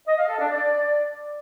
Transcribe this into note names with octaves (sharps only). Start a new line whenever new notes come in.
D#5
F5
A4
D4
D5